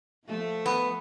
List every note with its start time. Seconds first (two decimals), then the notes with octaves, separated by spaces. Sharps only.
0.25 F3 A3
0.66 B3